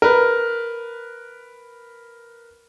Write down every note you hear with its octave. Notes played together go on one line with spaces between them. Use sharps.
A#4 B4